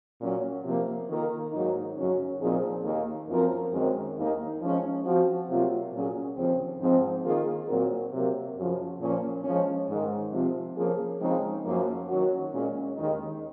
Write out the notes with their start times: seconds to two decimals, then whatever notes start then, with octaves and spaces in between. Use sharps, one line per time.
0.21 A#2 F#3 C#4
0.64 C3 F3 A#3
1.10 D#3 A#3 F4 A#4
1.53 G#2 D#3 F#3 A#3 D#4
1.97 F#2 C#3 F#3 C#4
2.41 A#2 F3 C4 D#4 G#4
2.84 D#2 D#3 A#3
3.29 F#2 F3 C4 F4 A#4
3.73 F#2 D#3 G#3 C4
4.16 D#2 D#3 A#3 D#4
4.62 F3 G#3 C#4
5.05 F3 C4 F#4
5.49 C3 F#3 A#3 F4
5.93 A#2 F#3 C#4 G#4
6.37 D#2 C#3 F3 C4
6.81 G#2 F3 C4
7.24 D#3 A#3 F4 G#4
7.68 A#2 F#3 C4 F#4 A#4
8.13 C3 F#3 A#3
8.57 F#2 C#3 F3
9.01 A#2 F3 A#3 C#4
9.44 F3 G#3 C#4
9.89 G#2 D#3 G#3
10.33 C3 F3 C4 F4
10.77 F3 A#3 C#4 G#4
11.20 C#3 F3 G#3 C4 D#4
11.65 F#2 F3 A#3
12.09 D#3 F#3 C#4 F#4
12.53 A#2 G#3 C#4
12.96 D#2 D#3 G#3 D#4